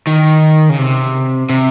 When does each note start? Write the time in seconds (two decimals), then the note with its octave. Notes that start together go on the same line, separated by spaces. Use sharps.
0.07 D#3
0.69 C#3
0.78 C3
1.49 C3